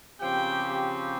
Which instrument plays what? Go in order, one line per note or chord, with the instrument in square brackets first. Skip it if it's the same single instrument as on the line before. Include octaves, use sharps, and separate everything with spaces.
[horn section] C#3 F3 C4 G4 [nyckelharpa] G5